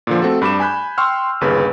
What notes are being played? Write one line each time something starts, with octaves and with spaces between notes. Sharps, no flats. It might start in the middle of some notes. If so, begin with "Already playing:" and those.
A#2 D3 F3
A3 C4 F#4 A4
G2 B5 D6 E7
G#5 B5 F#6 G6
G5 C6 C#6 E6 F6
G1 D#2 C#3 B4